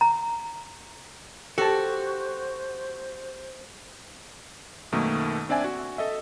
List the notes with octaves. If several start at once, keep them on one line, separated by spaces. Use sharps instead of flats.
A#5
F#4 G4 A4 C5 A5
F#2 B2 D#3 A3 A#3
C4 D4 D5 E5 G#5
F#4
A4 D#5 E5